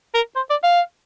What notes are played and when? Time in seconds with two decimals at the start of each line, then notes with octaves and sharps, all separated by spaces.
0.14 A#4
0.36 C5
0.50 D5
0.63 F5